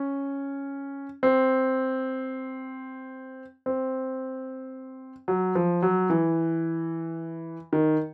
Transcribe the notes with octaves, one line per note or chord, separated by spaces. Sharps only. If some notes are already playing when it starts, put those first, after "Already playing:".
Already playing: C#4
C4
C4
F#3
F3
F#3
E3
D#3